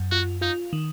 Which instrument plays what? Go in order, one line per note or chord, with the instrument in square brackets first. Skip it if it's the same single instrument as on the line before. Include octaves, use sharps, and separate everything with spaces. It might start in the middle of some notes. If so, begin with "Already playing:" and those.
Already playing: [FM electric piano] F#2
[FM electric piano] F4 [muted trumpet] F#4
[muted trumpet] D#4 [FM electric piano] F4
[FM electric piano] D#3